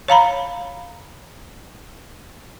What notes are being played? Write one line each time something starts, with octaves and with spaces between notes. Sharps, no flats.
C#5 F5 A#5 B5